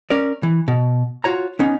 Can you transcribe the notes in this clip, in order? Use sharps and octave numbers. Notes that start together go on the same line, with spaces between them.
C#4 A#4 D5
E3
B2
F4 F#4 C#5 A#5
B3 C#4 D#4